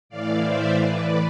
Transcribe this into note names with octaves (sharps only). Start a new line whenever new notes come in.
A2 E3 D5 F5
C5 E5
A2 E3 B4 D5